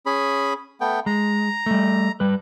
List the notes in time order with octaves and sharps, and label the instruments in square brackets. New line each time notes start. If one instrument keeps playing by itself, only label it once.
[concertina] C#4 G#4 B5
A3 B3 G5
[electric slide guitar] G#3 [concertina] A#5
[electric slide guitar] G3 A3
G3 B4